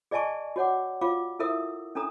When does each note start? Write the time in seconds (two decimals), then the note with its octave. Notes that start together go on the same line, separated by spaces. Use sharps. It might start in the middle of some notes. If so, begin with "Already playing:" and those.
0.11 G#4 D5 D#5 G#5 A5 C#6
0.56 F#4 C#5 F#5 D6
1.01 F4 F5 D6
1.39 E4 A4 A#4 E5 D#6 E6
1.95 C#4 D4 A4 A#5 D#6